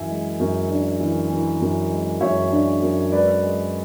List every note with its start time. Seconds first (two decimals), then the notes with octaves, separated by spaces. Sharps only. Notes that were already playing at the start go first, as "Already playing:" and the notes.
Already playing: F#2 E3 E5 G#5
0.09 G#3
0.39 F#2
0.70 D4
1.00 E3
1.30 E3
1.60 F#2
1.91 G#3
2.21 F#2 C#5 E5
2.51 D4
2.82 F#2
3.12 G#3 B4 D5
3.42 G#3